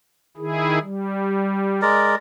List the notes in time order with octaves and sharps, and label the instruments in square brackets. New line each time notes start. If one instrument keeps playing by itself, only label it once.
[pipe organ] D#3 E4 G#4
G3
[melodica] G#3 A#4 D5